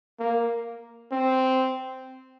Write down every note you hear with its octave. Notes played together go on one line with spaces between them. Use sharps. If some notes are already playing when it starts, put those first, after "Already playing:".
A#3
C4